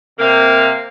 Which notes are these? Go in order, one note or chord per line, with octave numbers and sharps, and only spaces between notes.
C3 A#3